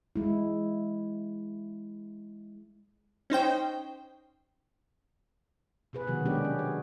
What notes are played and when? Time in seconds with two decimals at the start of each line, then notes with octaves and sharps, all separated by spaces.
0.16 G#3 E4
3.30 C#4 D#4 C5 G5
5.93 B2 G#4 B4
6.07 C3 D#3 F#3 B3 F#4
6.26 G#3 B3 C#4 D4 G4
6.45 C#4
6.59 G#4